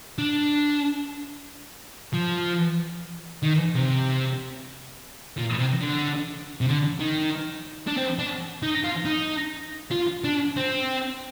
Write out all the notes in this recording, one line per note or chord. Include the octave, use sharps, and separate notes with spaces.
D4
F3
D#3
C3
A#2
C3
D3
C3
D3
D#3
D4
C4
D4
D#4
F4
D#4
F4
D4
C4